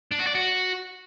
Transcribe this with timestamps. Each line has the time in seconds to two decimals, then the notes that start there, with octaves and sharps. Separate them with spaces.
0.12 D4
0.19 F#4
0.27 D5
0.34 F#4